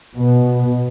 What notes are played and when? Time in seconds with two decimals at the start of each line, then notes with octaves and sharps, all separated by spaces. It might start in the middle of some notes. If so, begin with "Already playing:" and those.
0.16 B2